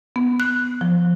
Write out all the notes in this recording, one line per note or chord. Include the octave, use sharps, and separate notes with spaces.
B3
F#6
F3